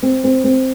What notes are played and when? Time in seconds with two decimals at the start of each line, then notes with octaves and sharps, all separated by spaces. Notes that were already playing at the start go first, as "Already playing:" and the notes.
0.03 C4
0.24 C4
0.44 C4